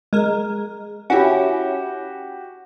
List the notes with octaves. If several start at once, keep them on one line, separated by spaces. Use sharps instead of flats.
G#3 A#4
C#4 E4 F#4 G4